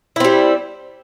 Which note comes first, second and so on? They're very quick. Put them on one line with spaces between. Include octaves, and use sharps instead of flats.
E4 C4 G3